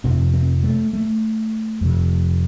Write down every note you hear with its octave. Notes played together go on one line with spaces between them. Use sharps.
F2 C3 C4
C4
A3
A3
F2 C3